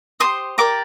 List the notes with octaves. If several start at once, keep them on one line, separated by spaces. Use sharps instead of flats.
G4 C5 D#5 C6 D#6
G4 A#4 D5 A#5 D6